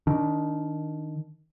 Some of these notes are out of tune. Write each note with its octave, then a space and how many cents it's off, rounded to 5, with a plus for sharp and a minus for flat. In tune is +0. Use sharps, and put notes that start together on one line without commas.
D#3 +0 D4 -20